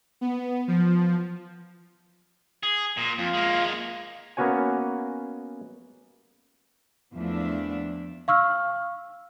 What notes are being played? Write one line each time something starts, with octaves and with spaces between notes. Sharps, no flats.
B3
F3
G#4
A#2
F2 F4 F5
G#3 A#3
A#3 B3 C#4 F#4 C#5 G#5
E2 F3 A3 D4 E5
F5 C#6 E6 F6